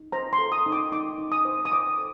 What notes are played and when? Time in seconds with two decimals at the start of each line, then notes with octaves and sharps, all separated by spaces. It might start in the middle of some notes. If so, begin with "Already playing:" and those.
Already playing: D#4
0.12 C5 A#5
0.33 C6
0.38 A4
0.52 D#6
0.66 D#4
0.72 D6
0.92 D#4 D6
1.18 D#4
1.32 D#6
1.45 C5
1.65 D#6
1.72 C5 D6
1.98 A4